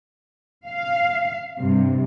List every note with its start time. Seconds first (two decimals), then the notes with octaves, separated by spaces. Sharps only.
0.67 F5
1.59 G2 C3